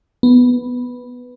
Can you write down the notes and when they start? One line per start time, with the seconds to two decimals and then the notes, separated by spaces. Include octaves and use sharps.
0.23 B3